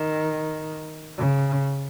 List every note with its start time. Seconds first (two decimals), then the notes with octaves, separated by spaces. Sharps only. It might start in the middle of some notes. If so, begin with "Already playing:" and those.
Already playing: D#3
1.18 C#3